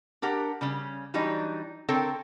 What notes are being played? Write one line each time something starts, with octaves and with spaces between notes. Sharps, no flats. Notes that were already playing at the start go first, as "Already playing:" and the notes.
D4 G4 A#4 F#5
C#3 G3 C#4
E3 F#3 G3 D4 D#4
D3 C4 A4 A#4 C#5 G5